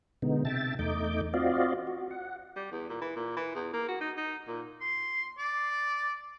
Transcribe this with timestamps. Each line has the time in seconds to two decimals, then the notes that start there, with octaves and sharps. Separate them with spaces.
0.22 B2 D3 G#3 B3 D#4
0.45 C3 E5 G5 A5 A6
0.79 E2 A3 D#4 D#5 D6 G6
1.34 C4 F4 F#4 D5 D#5 F5
1.87 F#4
2.11 F#5
2.56 G3
2.72 E2
2.89 A#2
3.01 E3
3.16 A#2
3.36 E3
3.55 E2
3.73 A#3
3.89 F#4
4.01 D#4
4.18 D#4
4.48 A#2
4.81 C6
5.38 D5